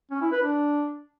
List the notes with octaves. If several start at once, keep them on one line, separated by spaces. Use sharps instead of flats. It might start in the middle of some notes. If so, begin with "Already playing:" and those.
C#4
E4
B4
D4